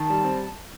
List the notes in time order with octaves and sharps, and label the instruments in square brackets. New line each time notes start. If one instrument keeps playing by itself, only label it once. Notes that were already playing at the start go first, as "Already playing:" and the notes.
Already playing: [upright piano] D#3 [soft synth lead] A5
[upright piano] G3
C4